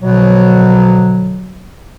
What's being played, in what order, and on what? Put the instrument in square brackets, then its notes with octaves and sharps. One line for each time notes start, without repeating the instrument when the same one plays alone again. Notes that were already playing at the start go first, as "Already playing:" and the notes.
[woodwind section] B2 D3 F3 F#3